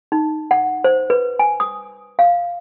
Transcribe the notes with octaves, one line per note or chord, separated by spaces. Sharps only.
D#4
F#5
C5
B4
G#5
D#6
F5